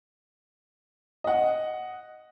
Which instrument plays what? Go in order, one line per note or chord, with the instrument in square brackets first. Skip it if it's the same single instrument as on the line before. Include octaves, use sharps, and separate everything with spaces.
[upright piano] D#5 F#5